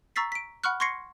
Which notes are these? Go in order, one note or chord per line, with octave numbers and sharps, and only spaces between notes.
A#5 C#6 E6 A6 B6 C7
B6 D7
F#5 B5 C#6 F6 F#6
C6 C#6 G#6 A#6 C7 C#7